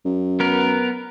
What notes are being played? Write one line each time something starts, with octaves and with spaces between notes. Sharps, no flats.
F#2
B3 A#4